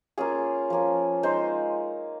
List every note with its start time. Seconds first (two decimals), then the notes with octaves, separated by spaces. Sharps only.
0.18 A#3 C#4 F4 G#4
0.70 F3 A#3 C#4
1.23 G#3 D#4 C5